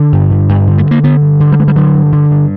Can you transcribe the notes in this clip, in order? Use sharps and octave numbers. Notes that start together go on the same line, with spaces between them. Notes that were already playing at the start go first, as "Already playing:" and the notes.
Already playing: D3 D4
G2
D3
G2
D3
A3
G2
A#3
D3 B3
G2
D3
G3
G2 G#3
G3
D3 F#3
G2
D3
G2